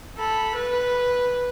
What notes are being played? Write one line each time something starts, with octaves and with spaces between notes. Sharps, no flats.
A4 B5
B4